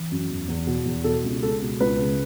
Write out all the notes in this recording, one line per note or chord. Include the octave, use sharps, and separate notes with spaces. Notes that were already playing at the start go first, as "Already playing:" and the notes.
Already playing: E3
F#2
E2
E2
B2
E2
B2 A4
C#2
G#3 A4
B2
C#2 B4
C#3